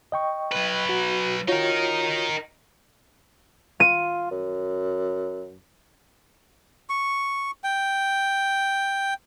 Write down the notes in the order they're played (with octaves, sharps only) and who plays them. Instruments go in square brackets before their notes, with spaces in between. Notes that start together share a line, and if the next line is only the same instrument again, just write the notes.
[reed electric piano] D#5 G5 C#6
[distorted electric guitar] F#3 B4
[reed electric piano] F#4
[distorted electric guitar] D#4 A#4 [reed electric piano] F4 F#4 C#5
[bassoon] F4 [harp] D#7
[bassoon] F#2
[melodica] C#6
G5